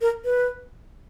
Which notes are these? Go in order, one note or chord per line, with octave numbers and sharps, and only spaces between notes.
A#4
B4